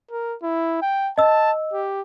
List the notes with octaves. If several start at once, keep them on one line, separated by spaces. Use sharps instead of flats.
A#4
E4
G5
D#5 A5 E6
G4